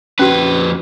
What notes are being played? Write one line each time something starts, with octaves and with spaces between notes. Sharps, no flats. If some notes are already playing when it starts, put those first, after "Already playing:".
F2 C#4 F#4 B4